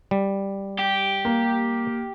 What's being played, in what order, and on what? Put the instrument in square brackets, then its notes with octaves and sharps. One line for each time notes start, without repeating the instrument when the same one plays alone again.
[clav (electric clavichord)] G3
[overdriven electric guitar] G4
[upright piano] A#3